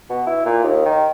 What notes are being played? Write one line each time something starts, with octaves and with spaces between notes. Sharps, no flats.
B2
E4
A#2
D#2
D#3